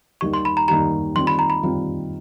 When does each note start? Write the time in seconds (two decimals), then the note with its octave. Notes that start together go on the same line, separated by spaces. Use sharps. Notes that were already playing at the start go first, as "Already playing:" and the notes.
0.21 D#2 D#3 G3 A#3 D#4 C#6
0.34 C6
0.45 B5
0.57 A#5
0.68 D#2 D#3 G3 A#3 D#4 A#5
1.16 D#3 G3 C4 F4 C6
1.27 B5
1.39 A#5
1.50 B5
1.63 D#3 G3 C4 F4